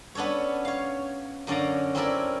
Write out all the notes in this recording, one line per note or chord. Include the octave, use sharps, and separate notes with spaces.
B3 C#4 D4 A4 C#5
C#5 F5
F#2 D3 C#4 D5 F5 A#5
C4 C#4 E4 A4 A#4 D5